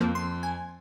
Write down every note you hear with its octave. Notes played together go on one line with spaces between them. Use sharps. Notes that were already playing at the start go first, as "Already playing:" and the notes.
F2 F3 A#3 C4
C6
G#5